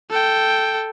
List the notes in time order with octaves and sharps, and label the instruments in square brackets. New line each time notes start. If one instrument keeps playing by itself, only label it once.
[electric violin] A4 G5